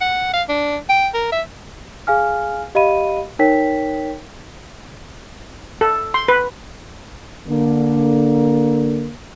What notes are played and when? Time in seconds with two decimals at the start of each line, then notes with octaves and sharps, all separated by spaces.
0.01 F#5
0.33 F5
0.49 D4
0.89 G5
1.14 A#4
1.32 E5
2.07 G#4 F5 G#5 F6
2.75 G4 D#5 F5 B5 D#7
3.39 D#4 A#4 C#5 G5 B6
5.81 A4
6.14 C6
6.28 B4
7.48 D3 A#3